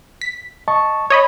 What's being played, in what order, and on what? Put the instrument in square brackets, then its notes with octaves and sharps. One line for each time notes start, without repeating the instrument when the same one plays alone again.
[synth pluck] B6
[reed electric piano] D#5 A5 C#6
[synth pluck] C#5 D#5 B5